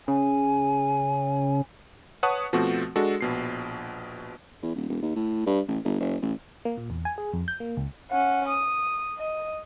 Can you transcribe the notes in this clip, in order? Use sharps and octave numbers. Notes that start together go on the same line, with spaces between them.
C#3 G#5
B4 C#5 F#5 A5 C#6 D#6
B2 F3 A3 C4 F#4
G#3 D4 F#4 A4
A#1 B2 C7
E2
D#1
E1
D#2
A2
G2
A1
G1
F#1
A1
A#3
A#2
E2
G#5
G#4
F2
G6
A#3
C#2
C#4 F#5
D#6
D#5